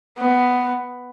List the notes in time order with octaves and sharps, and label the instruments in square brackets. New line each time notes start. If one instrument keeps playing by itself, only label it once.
[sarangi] B3